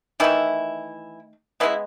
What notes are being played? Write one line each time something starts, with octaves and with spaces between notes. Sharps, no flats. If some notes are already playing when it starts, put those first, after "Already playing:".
D#3 E3 A3 E4
C#3 E3 G#3 B3 E4